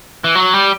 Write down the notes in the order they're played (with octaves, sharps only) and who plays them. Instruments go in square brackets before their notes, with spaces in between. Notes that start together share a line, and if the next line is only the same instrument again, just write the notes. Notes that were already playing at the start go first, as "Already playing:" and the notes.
[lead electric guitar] E3
F#3
G3